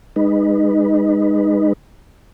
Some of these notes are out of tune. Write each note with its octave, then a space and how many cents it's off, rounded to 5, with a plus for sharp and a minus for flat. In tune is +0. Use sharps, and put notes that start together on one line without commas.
G#3 -25 D#4 -20 B4 +0